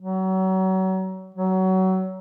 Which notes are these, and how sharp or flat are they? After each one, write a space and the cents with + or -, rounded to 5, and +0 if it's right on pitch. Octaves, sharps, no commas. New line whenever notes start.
F#3 +30
F#3 +25